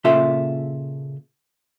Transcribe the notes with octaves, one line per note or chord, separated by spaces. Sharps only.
A#2 C#3 F4 A4 E5 C6